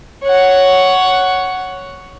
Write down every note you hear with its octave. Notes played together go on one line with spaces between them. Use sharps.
C#5 F#5